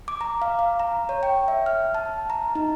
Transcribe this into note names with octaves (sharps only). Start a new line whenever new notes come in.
D6
A#5
F5
F5
A#5
C#5
G5
E5
F6
A5
A#5
D#4